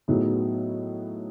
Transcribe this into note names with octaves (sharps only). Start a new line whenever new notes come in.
A2 F#3 B3 D#4 G#4